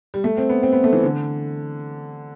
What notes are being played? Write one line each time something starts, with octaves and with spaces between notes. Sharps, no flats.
G3
A3
C4
B3
C4
B3
A3
E3
D3